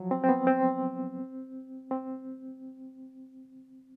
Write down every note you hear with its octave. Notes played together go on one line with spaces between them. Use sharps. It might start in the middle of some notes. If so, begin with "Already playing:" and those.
Already playing: F3 F#3
C4
C4
B3
C4
C4